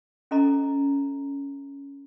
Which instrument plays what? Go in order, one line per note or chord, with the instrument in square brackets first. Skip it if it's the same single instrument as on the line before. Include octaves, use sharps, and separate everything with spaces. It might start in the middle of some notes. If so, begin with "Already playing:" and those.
[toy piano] C#4 A4 D#5 A#5